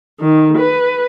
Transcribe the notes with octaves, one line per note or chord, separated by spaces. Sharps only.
D#3
B4